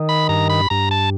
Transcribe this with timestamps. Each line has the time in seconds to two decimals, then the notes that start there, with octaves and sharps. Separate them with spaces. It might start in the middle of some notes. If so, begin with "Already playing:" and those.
Already playing: D#3
0.09 B5
0.29 G2 A#5
0.50 B5
0.70 G2 A#5
0.91 A5